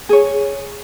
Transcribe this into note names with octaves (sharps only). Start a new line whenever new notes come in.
G#4 C#5